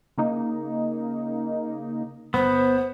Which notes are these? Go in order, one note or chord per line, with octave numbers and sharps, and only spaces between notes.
C#3 A#3 D#4
G1 B3 C5